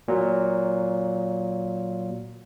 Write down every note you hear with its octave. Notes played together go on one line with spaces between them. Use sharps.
A#2 F#3